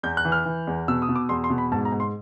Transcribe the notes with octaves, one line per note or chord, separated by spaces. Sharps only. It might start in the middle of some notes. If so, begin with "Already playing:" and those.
E2 G6
F#6
E3
F6
E3
E2
B2 E6
D#6
B2
D6
E2 C6
C6
B2
B5
G#2 A5
A#5
G#2
C6